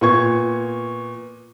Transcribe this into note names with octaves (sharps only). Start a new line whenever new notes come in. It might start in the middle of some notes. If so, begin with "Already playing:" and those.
A#2 B3 C#6 G#6